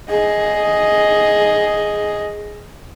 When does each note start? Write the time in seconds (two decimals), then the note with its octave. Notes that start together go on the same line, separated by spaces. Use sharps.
0.10 G#4 D#5